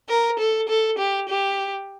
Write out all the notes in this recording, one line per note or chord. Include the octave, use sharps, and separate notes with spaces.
A#4
A4
A4
G4
G4